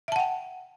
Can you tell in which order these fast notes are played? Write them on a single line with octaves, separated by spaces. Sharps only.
E5 A5 F#5 G5